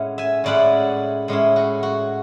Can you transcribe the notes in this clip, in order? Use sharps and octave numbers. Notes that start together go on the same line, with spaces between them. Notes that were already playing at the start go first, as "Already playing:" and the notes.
Already playing: A2 G#3 C#4 E4 F#5
E5 G#5
A2 G#3 C#4 E4 D5 F#5
A2 G#3 C#4 E4
F#4
F#4